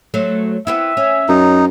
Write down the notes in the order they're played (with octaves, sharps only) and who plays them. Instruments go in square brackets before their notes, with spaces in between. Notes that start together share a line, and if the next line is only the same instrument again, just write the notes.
[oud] F#3 A3 C5
[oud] B3 C4 E4 [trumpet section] E5
[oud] C#4
[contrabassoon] F#2 [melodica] D#4